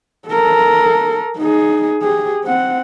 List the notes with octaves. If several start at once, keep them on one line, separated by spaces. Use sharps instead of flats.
A4 A#4
D#4 G#4
G4 G#4
C4 F#5